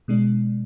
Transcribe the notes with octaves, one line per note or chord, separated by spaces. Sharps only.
B2 G#3 D4